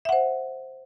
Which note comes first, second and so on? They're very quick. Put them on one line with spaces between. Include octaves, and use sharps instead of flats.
E5 F#5 C5